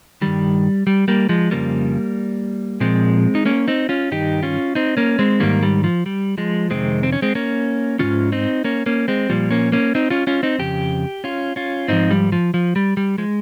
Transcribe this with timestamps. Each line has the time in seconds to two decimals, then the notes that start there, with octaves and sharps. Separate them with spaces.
0.22 G2 D#3 G3
0.87 G3
1.08 G3 A#3
1.29 F3 G#3
1.51 F2 C#3 F3 G3 A#3
2.80 A#2 F3 G#3 C4
3.35 D#4
3.45 A#3 C#4
3.68 C4 D#4
3.89 C#4 F4
4.11 G2 D#3 D#4 G4
4.43 C#4 F4
4.75 C4 D#4
4.97 A#3 C#4
5.19 G#3 C4
5.40 G#2 D#3 G3 A#3
5.62 G3
5.84 F3
6.06 G3
6.38 F3 G#3
6.70 F2 C3 D#3 G#3 C4
7.03 C4
7.12 C#4
7.22 G#3 C4
7.35 A#3 C#4
7.99 G#2 D#3 C#4 F4
8.32 C4 D#4
8.64 A#3 C#4
8.86 A#3 C#4
9.08 G#3 C4
9.30 A#2 F3 G3
9.51 A#3 C#4
9.72 A#3 C#4
9.95 C4 D#4
10.10 C#4 F4
10.27 C#4 F4
10.43 C4 D#4
10.59 F2 C#3 G4
11.24 C#4 F4
11.56 C#4 F4
11.88 G#2 F3 C4 D#4
12.10 G3
12.32 F3
12.54 F3
12.76 G3
12.97 G3
13.18 F3 G#3